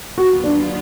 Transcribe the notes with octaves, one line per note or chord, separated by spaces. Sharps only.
D#2 D3 F#3 B3 F4 F#4
D4